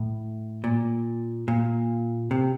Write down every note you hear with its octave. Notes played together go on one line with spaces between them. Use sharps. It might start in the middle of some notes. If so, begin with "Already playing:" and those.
Already playing: A2
A#2
A#2
C3